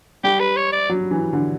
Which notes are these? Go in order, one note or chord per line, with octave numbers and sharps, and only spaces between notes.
G3 G4
B4
C#5
D5
F#3
E3
D3